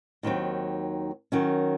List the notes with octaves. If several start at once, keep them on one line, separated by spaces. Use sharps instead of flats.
D#2 D#3 F#3 C4
D#3 F#3 C#4